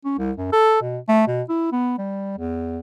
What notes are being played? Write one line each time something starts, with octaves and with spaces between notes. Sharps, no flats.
C#4
C2
F#2
A4
B2
A3
B2
E4
B3
G3
E2